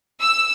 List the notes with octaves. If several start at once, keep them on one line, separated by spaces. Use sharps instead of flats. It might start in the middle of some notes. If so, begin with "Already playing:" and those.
E6